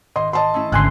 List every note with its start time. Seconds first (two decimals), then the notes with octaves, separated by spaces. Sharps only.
0.16 G#1 D#5 C6
0.33 D#5 A5 C6
0.54 A3 C#4 E4
0.72 G#1 D2 D3 G#5 C6 F#6